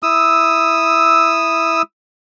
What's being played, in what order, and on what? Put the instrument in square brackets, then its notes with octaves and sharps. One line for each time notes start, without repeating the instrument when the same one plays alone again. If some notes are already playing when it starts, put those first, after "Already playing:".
[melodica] E4 D#6 E6